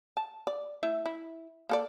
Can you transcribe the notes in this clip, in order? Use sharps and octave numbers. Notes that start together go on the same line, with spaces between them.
A5
D5
A3 E4 E5
E4
A#3 A4 D5